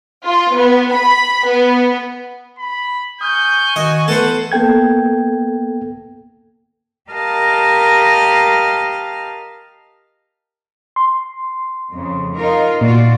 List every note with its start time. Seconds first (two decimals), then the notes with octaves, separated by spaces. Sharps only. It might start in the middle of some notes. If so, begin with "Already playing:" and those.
0.24 F4
0.55 B3
0.93 B5
1.46 B3
2.58 B5
3.21 G#5 C#6 D#6 F6 G6
3.76 D#3 F#4 D#5
4.08 E3 A3 B3 A4 B4 C5 F#5
4.52 A#3 B3 A4 G5 G#6
7.11 G4 A#4 D#5 F5 A5 F6
10.96 C6
11.91 F2 C#3
12.37 D#4 F4 A#4
12.81 A#2 F4 F#4 D5